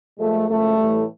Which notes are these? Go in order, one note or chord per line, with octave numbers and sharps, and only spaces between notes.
A#2 F3 G#3 A3
F#2 C#3 F3 G#3 A3
A2 E3 G3